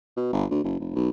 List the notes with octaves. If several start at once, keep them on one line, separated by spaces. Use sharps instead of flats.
B2
G1
D2
F#1
F1
B1